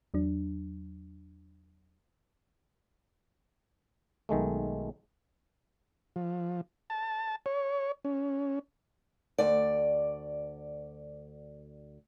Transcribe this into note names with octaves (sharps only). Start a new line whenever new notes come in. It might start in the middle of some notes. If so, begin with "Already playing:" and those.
E2 F#3 D4
B1 D#3 G#3 A3
F3
A5
C#5
C#4
D2 D5